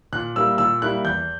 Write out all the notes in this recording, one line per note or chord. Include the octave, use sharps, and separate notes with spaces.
A#2 F#6
G3 A#3 E4 E6
A#2 E6
G3 A#3 E4 F#6
E2 G6